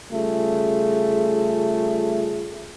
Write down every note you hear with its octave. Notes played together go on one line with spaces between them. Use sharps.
C#3 G3 A3 F4 G#4